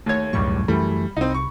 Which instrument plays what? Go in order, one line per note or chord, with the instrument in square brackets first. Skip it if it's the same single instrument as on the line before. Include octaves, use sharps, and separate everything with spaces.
[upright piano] D#2 G#6 [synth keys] A3 C#5
[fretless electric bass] E1 F#2 A2 [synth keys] C#2 G3 C#6
[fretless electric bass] F#2 E3 A3 [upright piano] G3 [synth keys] B5
[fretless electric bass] C2 [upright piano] C4 D#4
[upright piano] C#6